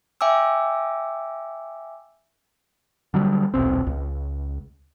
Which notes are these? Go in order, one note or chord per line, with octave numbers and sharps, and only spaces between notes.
E5 G5 G#5 D6 E6
D3 F#3 G3
D#1 B1 C4
C#2